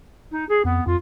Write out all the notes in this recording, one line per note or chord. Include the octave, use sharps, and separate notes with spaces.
D#4
G#4
F2 B3
F2 F4